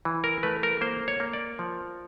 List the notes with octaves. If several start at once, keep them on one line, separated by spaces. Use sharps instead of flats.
E3
A#4
A3 B4
A#4
A#3 C5
C#5
A#3
D5
F3